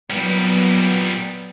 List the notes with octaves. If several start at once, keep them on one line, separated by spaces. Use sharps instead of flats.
A#2 F#3 G3 B3